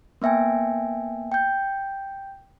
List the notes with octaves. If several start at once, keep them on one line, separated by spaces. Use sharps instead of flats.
A#3 B3 E5 G5 G#5
G5 G6